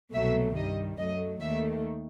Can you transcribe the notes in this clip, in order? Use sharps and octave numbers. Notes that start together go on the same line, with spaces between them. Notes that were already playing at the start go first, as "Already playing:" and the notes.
C2 B2 F#3 A3 E5
G2 D#3 G3 D#5
F#2 F#3 A3 D#5
D#2 D#3 A3 E5